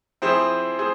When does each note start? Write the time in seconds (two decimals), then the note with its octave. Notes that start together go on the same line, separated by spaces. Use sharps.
0.22 F3 C4 E4 G#4 C5
0.79 G#4 C5